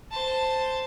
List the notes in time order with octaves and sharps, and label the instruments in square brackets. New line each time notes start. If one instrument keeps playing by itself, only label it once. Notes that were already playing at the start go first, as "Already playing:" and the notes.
[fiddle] C5 A5